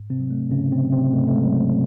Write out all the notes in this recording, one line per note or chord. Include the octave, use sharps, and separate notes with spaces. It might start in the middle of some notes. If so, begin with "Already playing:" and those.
Already playing: G#2
C3 C4
F#3
A3
G#2 C#3 C#4
C3 C4
F#3
C3 C4
G#2 A3
A3
G#3
F#3
A3